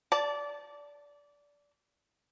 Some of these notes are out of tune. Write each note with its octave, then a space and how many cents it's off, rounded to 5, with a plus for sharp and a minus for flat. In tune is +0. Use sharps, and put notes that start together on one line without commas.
D5 -20 A5 +0